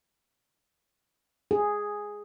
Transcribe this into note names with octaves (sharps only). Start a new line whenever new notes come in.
G#4